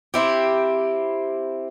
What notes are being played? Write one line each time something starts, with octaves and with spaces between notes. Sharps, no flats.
C4 E4 G4